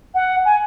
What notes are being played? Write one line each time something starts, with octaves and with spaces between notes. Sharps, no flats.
F#5
G#5